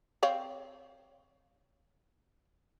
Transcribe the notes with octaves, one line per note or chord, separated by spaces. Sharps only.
C4 C#5 F5